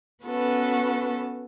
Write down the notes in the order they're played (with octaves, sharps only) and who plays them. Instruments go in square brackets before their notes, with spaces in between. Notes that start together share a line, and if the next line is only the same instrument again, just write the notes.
[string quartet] B3 C#4 F#4 A4 B4